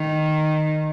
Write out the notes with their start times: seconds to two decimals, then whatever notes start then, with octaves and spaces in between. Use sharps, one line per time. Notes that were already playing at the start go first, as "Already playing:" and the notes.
Already playing: D#3